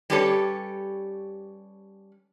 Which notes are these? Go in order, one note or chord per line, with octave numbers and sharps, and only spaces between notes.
G3 C#4 G4 A4 B4 C#5